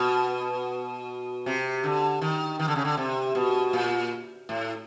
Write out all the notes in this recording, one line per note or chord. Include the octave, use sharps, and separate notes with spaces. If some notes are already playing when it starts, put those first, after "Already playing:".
Already playing: B2
C3
D3
D#3
D#3
D3
C#3
D3
C3
B2
A#2
A2